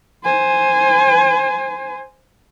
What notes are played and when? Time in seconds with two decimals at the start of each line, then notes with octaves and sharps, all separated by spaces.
0.24 C5 G#5